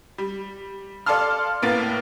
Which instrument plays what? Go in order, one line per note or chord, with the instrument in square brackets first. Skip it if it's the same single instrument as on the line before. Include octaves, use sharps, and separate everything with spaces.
[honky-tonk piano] G3
A4 D5 F5 A5 C6 F6
A2 A#3 B3 A6